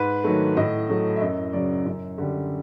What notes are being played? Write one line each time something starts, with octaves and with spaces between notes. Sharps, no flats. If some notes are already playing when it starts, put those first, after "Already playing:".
Already playing: G#2 B4
D#3 F#3 A3
A2 D#5
F#3 A3
E5
F#2 D#5
C#3 F#3 D5
F#2
D3 G3